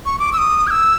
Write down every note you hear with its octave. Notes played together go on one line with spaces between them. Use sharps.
C#6
D6
E6
D#6
G#6
E6